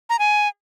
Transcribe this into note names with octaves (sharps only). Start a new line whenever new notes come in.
A#5
G#5